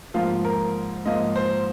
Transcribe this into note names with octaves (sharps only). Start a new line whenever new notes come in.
G#2 F3 A#3 F4
A#4
G#2 F3 A#3 D#5
C5